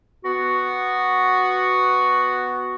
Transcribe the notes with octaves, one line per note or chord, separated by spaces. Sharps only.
B3 F#4